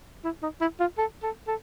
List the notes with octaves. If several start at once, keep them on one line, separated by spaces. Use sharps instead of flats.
E4
D#4
E4
F4
A4
A4
A4